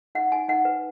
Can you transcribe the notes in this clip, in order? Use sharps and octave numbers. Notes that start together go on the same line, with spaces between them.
D#4 F#5
D#4 G#5
D#4 F#5
B4